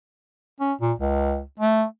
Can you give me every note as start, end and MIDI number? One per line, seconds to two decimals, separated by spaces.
0.60 0.73 61
0.81 0.93 46
0.98 1.42 37
1.59 1.85 57